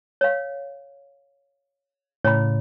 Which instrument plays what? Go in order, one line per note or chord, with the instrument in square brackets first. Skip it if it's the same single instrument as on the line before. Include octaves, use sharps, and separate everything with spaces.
[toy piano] C#5 F5
[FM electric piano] A2 C#3 [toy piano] C#5 B5